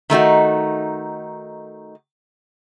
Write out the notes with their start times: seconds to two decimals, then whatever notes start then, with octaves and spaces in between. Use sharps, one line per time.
0.10 D#3 A3 D#4 F#4